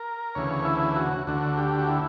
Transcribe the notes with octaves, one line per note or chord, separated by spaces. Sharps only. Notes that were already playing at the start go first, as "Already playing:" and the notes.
Already playing: A#4
D2 C#3 E3 C#5
E4
F#4
D2 D3 F#4
G4
F#4
E4